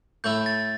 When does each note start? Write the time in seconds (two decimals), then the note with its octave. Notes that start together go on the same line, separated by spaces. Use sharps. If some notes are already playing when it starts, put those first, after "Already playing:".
0.24 A2 A3 E4 G6
0.46 A6